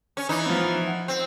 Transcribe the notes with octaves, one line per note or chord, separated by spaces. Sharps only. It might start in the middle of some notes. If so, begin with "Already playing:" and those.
C#4
E3 D#4
F3 B3
F#5
C4